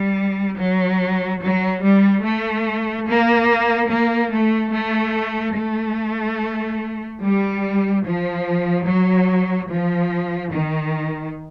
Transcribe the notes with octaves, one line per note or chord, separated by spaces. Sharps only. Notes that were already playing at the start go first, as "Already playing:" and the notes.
Already playing: G3
F#3
F#3
G3
A3
A#3
A#3
A3
A3
A3
G3
F3
F#3
F3
D#3